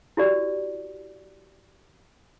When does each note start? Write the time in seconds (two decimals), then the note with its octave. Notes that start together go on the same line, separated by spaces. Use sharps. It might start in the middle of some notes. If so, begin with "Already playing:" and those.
0.17 E4 F#4 G4 D5